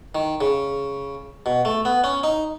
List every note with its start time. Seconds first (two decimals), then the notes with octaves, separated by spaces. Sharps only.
0.15 D#3
0.41 C#3
1.46 B2
1.65 A3
1.85 B3
2.04 C#4
2.23 D#4